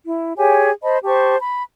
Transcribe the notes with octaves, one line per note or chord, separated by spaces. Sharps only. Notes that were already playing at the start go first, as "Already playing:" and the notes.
E4
G4 G#4 C#5 G#5
C5 D#5 A5 B5
G4 C5 A5 C#6
B5